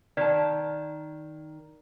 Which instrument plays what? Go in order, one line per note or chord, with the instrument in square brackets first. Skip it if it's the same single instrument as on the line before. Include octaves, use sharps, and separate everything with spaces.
[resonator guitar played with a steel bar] D#3 A5 [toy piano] D5